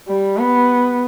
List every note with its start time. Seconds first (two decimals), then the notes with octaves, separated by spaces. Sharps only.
0.08 G3
0.38 B3